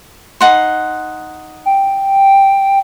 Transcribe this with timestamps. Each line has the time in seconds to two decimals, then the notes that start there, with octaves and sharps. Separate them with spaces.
0.41 D#4 F#5 C6
1.66 G5